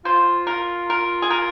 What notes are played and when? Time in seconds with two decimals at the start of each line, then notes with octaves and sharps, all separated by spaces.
0.05 F4 C5
0.47 A#4
0.90 A#4
1.22 G#4
1.30 A#4